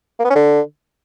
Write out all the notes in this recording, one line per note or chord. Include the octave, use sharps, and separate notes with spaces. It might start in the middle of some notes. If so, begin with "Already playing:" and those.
A#3
B3
C#4
D3